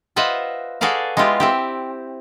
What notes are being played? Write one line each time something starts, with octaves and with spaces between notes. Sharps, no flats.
F4 B4 C5 D#5 E5 F#5
F#4 G#4 A4 B4 D5 F5
G#3 B3 E4 F4 G4
C4 E4 G4